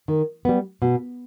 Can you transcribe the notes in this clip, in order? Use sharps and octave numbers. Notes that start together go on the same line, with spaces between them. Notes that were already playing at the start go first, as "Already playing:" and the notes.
D#3
G3 B3
B2